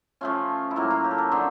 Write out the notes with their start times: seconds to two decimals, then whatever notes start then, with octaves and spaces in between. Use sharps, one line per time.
0.21 F3 A3 C#4 F4
0.71 E4
0.76 A2 F#3 A#3 F4
0.90 F4
1.04 G4
1.11 A4
1.18 A#4
1.32 D3 F3 A3 C4